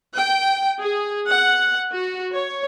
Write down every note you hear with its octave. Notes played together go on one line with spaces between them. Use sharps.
G5
G#4
F#5
F#4
C#5